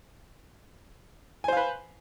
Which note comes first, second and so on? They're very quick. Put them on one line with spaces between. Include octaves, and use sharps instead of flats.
G#5 C5 F5 B4